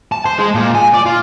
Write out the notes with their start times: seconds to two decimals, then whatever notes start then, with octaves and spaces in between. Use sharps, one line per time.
0.12 A5
0.25 C5
0.38 G#3
0.55 A#2
0.75 G#5
0.94 D5
1.06 F4